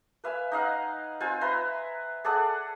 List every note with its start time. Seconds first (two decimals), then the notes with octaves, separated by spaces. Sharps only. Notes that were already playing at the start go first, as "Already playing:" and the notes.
0.24 B4 E5 F5 G#5
0.52 D#4 D#5 F5 F#5
1.20 C4 F4 C5 G#5
1.41 B4 E5 A#5 C6
2.24 G#4 A4 D5 F#5